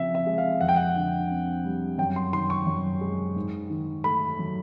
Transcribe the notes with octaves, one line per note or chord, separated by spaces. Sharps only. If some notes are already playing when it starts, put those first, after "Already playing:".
Already playing: C#3 F3 C4 E5
E5
G#3
F5
F2 F#5
G5
F#5
D3
C4
G3
F#2 G5
C6
D#3 C6
C#6
F#2
G#3
G#2
D#3
A3 B5
F#3